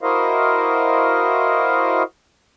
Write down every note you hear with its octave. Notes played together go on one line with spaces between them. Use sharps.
E4 F#4 A#4 C5 D#5 F5